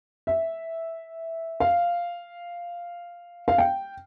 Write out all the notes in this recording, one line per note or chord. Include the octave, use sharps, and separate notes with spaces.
E5
F5
F5
G5